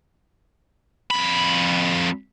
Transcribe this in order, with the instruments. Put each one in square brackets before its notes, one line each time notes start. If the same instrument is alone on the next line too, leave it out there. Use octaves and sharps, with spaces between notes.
[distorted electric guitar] F2 B5